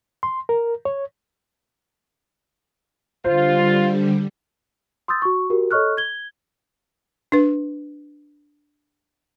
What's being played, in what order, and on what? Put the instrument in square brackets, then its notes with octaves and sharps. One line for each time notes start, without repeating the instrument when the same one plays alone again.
[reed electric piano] C6
A#4
C#5
[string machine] D3 G3 [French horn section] F4 [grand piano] C5
[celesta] C6 D#6 E6 G6 A6
F#4 C#6
F#4 G4 A#4
A4 C#5 D#5 C#6 F6 F#6
G#6 G7
[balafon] D4 B4